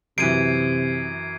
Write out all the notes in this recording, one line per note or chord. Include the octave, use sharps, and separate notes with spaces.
F#2 C3 E3 G#6 C7 D7 D#7